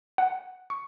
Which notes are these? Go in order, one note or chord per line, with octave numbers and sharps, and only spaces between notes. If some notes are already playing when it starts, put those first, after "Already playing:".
F#5
C#6